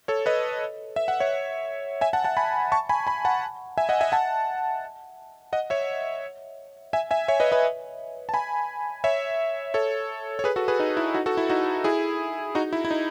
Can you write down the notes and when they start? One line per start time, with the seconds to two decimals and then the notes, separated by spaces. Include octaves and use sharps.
0.08 A4 C#5
0.26 B4 D#5
0.96 E5
1.08 F#5
1.20 C#5 E5
2.01 E5 G#5
2.13 F#5 A5
2.24 F#5 A5
2.37 G#5 B5
2.72 A5 C#6
2.89 G#5 B5
3.07 G#5 B5
3.25 F#5 A5
3.78 E5 G#5
3.89 D#5 F#5
4.01 E5 G#5
4.12 F#5 A5
5.53 D#5 F#5
5.70 C#5 E5
6.93 E5 G#5
7.11 E5 G#5
7.28 C#5 E5
7.40 B4 D#5
7.52 B4 D#5
8.29 A5
8.34 G#5 B5
9.04 C#5 E5
9.74 A4 C#5
10.39 C#5
10.44 G#4 B4
10.56 F#4 A4
10.68 G#4 B4
10.80 D#4
10.97 E4
11.14 D#4 F#4
11.26 F#4 A4
11.37 E4
11.49 D#4 F#4
11.84 E4 G#4
12.55 D#4 F#4
12.73 E4
12.85 E4
12.91 D#4